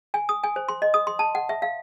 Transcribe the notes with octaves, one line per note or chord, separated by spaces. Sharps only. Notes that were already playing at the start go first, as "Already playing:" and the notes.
G#5
D#6
G#5
C5
C6
D#5
D#6
C6
A5
F#5
E5
F5